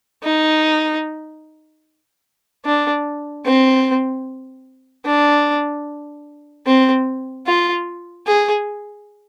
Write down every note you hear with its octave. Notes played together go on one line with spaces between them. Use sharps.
D#4
D4
C4
D4
C4
F4
G#4